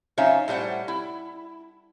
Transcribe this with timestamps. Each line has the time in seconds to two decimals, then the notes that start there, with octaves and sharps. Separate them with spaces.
0.18 F3 C#4 D#4 C#5 E5 F5
0.48 A2 G3 C5 C#5 F#5
0.88 E4